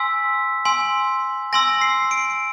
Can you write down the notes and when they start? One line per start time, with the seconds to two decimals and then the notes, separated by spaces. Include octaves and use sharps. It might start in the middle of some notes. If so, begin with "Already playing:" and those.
Already playing: G#5 C6 E6 B6
0.65 G#5 C6 E6
1.53 G#5 C6 E6 A#6
1.81 C7
2.11 D7